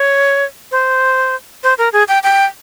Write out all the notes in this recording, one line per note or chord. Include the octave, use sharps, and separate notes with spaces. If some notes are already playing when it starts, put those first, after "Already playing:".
Already playing: C#5
C5
C5
A#4
G#4
G5
G5